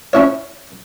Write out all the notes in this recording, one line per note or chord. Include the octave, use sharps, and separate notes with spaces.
C#4 E4 C#5